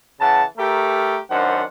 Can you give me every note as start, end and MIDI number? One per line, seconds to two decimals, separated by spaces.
0.20 0.43 49
0.20 0.43 52
0.20 0.43 78
0.20 0.43 81
0.57 1.18 57
0.57 1.18 67
0.57 1.18 69
0.57 1.18 70
1.29 1.63 42
1.29 1.63 51
1.29 1.63 62
1.29 1.63 72
1.29 1.63 78